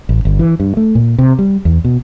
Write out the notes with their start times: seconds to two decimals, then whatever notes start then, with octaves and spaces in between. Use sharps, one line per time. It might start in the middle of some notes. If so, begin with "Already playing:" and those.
0.09 A1
0.25 G1
0.39 E3
0.60 G2
0.77 A3
0.95 A#2
1.18 C3
1.39 G3
1.65 E2
1.85 B2